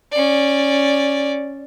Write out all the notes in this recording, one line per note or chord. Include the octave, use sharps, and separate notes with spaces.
C#4 D5